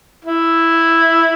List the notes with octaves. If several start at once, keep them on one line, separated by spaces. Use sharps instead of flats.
E4